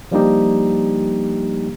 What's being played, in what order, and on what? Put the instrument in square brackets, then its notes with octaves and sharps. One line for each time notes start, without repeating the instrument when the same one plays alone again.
[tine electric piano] F3 G3 A#3 D4 D#4 G4